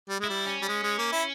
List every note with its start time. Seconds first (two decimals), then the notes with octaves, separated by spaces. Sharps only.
0.09 G3
0.20 G#3 E4
0.29 G3
0.46 C#4
0.62 G3
0.68 G#3
0.83 G#3
0.98 A#3
1.12 E4